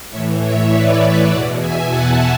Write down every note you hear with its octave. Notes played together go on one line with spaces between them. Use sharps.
A2 E3 C#5 E5
C#5 E5
B4 D5
E2 B2 D5 F#5
E5 G#5
F#5 A5